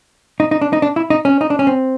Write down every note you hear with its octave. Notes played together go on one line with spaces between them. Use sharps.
D#4
D#4
D4
D#4
D4
E4
D#4
C#4
D#4
D4
C#4
C4